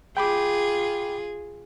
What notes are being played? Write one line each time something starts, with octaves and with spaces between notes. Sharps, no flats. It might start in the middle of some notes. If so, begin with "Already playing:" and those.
F4 G#4 G5 B5 D6